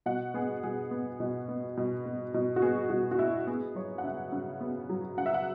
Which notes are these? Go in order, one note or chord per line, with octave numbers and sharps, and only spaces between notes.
B2 F#5
B3 G#4
B2 G#4
B3
B2
B3
B2
B3
B2
F#4
B3 G#4
B2 F#4
F#4
B3 E4
B3 G#4
F#3 C#5
F#5
C#3 E5
C#3
B3
F#3
C#3 F#5
E5
F#5